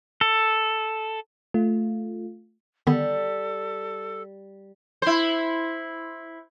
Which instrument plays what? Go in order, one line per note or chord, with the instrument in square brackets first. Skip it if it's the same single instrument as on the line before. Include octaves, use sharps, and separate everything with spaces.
[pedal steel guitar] A4
[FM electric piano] A3 F4
[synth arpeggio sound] D3 D#3 B3 [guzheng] G3 [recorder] A4
[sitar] E4 C5